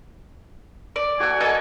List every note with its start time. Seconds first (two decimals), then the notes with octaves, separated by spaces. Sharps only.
0.96 D5
1.20 F#4 A4 F#5 G#5
1.40 A4 A#4 D#5 G#5